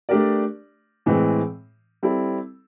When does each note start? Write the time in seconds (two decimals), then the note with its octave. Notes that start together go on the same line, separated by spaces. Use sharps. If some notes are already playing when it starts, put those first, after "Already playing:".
0.09 A3 D4 G4 A#4 D5
1.06 A2 E3 G#3 C4
2.03 G3 C4 E4 A4